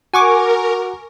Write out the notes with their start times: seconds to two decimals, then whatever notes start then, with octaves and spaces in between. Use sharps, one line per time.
0.13 F#4 A#4 F#5 G#5 C#6 D6